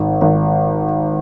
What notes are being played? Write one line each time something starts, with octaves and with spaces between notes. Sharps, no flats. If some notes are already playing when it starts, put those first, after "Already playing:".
Already playing: G#1 D#3
G#1